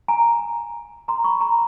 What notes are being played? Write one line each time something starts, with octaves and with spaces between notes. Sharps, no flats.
G#5 A#5
A#5 C6
B5 C#6
A#5 C6